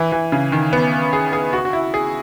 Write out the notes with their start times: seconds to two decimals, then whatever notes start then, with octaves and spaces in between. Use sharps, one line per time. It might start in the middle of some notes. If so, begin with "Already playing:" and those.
Already playing: E3
0.12 E3
0.32 C#3
0.52 D#3
0.73 B3
1.13 G#4
1.33 G#4
1.53 F#4
1.65 F#4
1.73 E4
1.94 G#4